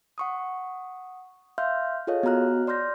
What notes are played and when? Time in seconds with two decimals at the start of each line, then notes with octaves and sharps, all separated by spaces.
0.18 F#5 C#6 D#6
1.58 E5 F5 C6 F6 G6
2.07 F4 G#4 A4 C#5 D#5 F5
2.23 B3 F#4 G4 A#5 F6 F#6
2.67 D5 C6 F6 G6 A#6